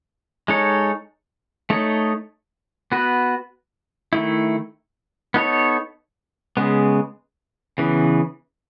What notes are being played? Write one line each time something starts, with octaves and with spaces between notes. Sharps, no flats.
G#3 D#4 A4 C#5
A3 D#4 A4 C#5
B3 F#4 B4
D#3 A3 E4
B3 D#4 A4 C#5
C#3 G#3 B3
C#3 E3 B3